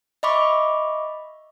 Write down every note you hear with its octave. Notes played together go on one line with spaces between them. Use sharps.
D#5 E5 B5 C#6 D6